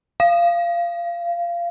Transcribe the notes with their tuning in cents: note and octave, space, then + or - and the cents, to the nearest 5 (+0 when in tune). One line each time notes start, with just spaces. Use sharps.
F5 -20